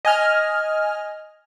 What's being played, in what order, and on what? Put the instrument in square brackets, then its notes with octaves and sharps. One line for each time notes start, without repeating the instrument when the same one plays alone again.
[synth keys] D#5 G#5 F6